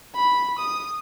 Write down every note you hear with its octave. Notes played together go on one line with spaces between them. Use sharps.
B5
D#6